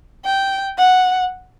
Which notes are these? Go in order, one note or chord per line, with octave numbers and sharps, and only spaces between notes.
G5
F#5